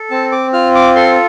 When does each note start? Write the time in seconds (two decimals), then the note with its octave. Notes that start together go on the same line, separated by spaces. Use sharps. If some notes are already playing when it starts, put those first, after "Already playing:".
Already playing: A4
0.11 C4 A5
0.32 D6
0.53 F4 F6
0.75 D6
0.95 A4 C6